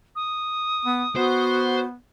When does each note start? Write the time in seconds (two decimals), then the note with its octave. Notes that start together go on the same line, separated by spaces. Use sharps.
0.16 D#6
0.85 B3
1.16 B3 F#4 C5